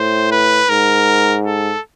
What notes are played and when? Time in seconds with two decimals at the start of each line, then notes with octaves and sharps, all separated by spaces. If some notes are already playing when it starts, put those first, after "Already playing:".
Already playing: A2 C5
0.32 B4
0.69 G#2 A#4
1.46 A4